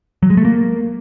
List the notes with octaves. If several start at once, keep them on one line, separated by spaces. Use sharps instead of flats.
F#3
G#3
A3
A#3